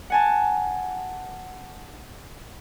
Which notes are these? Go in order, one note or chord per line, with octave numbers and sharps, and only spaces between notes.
F#5 G#5 A5